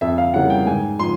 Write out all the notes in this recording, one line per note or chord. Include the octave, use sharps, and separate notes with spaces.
F2 E5
F5
C#3 E3 G3 A#3 F#5
G5
G#2 G#5
F3 C6